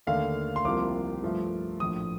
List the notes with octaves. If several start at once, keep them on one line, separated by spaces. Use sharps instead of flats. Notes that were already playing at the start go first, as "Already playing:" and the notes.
D#2 D3 A3 F5
C6
C2 C3 F3 A#3 D6
G2 F3 A3
A#1 A2 F3 D#6